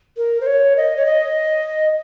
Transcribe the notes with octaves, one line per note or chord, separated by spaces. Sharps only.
A#4
C5
C#5
D#5
C#5
D#5